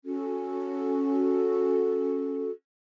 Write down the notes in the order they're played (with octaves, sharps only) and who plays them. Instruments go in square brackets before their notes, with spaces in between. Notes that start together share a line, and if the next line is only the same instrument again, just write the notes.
[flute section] C#4 F#4 A4